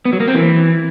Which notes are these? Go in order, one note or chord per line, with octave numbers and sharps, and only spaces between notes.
B3
F#3
A#3
C4
E3